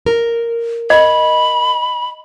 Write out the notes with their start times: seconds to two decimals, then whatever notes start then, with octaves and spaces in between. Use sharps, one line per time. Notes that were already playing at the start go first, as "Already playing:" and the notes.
0.06 A#4
0.90 D#5 B5